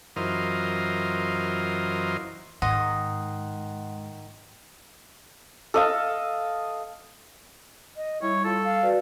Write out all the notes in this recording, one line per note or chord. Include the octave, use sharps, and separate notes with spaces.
F#2 E3 F4 A#4 C5 D#5
G#2 D#3 D#5 F#5 C6
A4 D#5 F5
D#5
G3 E4 C#5
F4 A4
F5
F#4 B4 D5